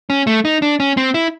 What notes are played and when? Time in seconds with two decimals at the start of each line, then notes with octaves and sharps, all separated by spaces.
0.10 C#4
0.27 A3
0.45 D#4
0.62 D4
0.80 C#4
0.97 C4
1.14 E4